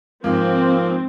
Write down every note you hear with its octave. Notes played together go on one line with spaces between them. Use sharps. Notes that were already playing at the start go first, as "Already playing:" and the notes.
G#2 F3 A#3 C4